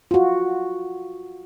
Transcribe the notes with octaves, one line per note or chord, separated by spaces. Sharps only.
F4 F#4